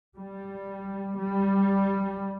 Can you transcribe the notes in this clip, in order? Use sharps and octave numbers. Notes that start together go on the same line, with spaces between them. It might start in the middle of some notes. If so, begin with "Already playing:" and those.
G3
G3